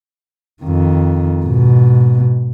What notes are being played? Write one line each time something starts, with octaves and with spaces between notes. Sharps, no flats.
F2 D#3
G#2 B2